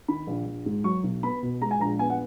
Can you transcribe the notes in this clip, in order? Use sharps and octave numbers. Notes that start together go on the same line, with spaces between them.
D#3 B5
A#1
A#1
G#2
F#3 C#6
B1
B3 B5
B2
G#3 A#5
G#5
A#1 A#5
B3 G#5
F#5